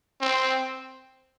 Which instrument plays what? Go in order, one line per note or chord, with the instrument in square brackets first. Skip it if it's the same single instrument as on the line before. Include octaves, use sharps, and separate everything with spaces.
[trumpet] C4